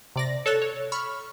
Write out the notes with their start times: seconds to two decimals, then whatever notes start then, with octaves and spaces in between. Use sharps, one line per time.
0.16 C3 D5 A#6
0.46 A4 C#5 E6 F#6
0.62 C#5
0.92 B5 C#6 F6